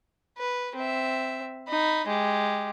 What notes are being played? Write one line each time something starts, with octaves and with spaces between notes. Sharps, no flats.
B4
C4 E5
D#4 B5
G#3 G4